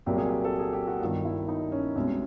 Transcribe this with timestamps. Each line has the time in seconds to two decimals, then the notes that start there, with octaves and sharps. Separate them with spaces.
0.06 C2 A#2 F#3 A#3 G4
0.18 G#4
0.29 G4
0.44 A4
0.59 G#4
0.73 G4
0.87 F#4
1.00 G1 G2 D#3 F4
1.25 E4
1.48 D#4
1.72 C#4
1.96 C2 B2 G#3 C#4